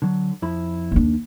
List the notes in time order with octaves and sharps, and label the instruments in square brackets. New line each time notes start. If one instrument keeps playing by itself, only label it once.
[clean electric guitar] D3 F#3
F2 E4 B5
[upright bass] D#2 D4